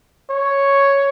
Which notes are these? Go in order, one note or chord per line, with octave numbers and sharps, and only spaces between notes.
C#5